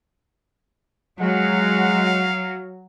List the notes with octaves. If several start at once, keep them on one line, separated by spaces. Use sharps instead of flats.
F#3 G#3 F5 F#5